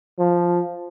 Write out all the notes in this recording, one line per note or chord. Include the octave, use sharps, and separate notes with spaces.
F3